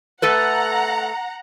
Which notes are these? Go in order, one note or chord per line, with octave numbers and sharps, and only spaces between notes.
A3 A4 B4 F#5 A#5